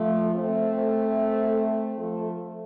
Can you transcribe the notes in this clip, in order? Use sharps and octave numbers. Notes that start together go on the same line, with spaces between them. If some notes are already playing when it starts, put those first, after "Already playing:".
Already playing: F3 A3
A3 C4
F3 A3